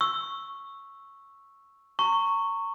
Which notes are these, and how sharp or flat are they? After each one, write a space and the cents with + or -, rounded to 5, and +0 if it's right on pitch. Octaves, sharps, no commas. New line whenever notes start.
C#6 -5 E6 +0
A#5 -35 C#6 +0